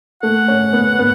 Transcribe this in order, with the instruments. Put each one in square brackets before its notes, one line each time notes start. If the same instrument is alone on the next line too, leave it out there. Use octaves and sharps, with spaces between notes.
[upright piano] A3 [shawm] F#5
[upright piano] C#4
B3
B3